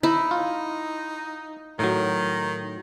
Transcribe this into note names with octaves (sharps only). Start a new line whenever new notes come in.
D#4 E4
F4
A2 D#3 F#3